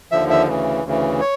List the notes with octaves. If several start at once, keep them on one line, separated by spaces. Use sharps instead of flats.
D#2 D3 F3 E5
E5
D2 C#3 E3
D2 C#3 E3
C#5